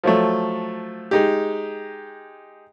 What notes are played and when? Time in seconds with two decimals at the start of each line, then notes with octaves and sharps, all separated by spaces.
0.04 F3 F#3 A3
1.11 G#3 D#4 G4